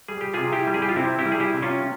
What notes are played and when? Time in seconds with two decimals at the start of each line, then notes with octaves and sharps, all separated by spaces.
0.08 G3 G#4
0.21 G4
0.34 C3 F4 G#4
0.52 E4 G4
0.67 G3
0.74 G#4
0.82 G4
0.89 F4
0.96 C3 C4 E4
1.19 E4 G4
1.26 G3
1.32 G#4
1.40 E4 G4
1.54 C3
1.62 C#4 F4